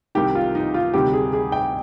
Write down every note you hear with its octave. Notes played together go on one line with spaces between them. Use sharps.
C2 C3 D#3 G4
F4
D#4
F4
D2 C3 D#3 G3 G4
G#4
G#4
G5